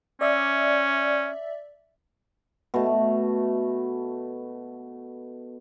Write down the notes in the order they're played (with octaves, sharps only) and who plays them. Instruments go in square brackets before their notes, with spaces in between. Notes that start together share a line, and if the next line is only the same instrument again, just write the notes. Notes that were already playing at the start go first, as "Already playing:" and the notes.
[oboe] C#4 [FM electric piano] D5 E5
[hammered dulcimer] B2 A3